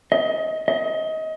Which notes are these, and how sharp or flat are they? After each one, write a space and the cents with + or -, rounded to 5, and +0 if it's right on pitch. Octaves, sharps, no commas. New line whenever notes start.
D#5 +25
D#5 +25